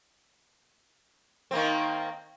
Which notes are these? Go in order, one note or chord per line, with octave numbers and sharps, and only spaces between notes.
D#3 A#3 C4